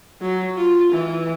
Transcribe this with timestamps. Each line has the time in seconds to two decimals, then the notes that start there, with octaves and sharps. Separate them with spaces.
0.22 F#3
0.57 F4
0.91 E3